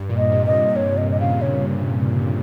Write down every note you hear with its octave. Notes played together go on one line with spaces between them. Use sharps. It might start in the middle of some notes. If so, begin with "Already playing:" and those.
Already playing: G2
A#2
D#5
C3
D#5
A#2
C3 C#5
D#5
D#5
C#3 F5
C3
C#3 C#5